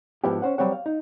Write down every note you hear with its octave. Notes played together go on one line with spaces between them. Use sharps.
G#2 F3 B3 D4 E4 G4
C#4 C5 F#5
F#3 G3 C4 C#5 F#5
F5
D#4